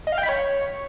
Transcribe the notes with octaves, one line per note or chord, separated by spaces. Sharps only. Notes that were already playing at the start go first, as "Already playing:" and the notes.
D#5
F5
G5
B5
C#5